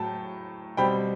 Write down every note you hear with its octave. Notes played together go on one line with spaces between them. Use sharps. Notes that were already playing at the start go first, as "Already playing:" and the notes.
Already playing: A2 F#3 G5 A5
B2 G3 C4 G5 B5